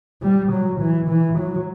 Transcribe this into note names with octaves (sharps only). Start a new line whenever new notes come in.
G3
F#3
E3
E3
F#3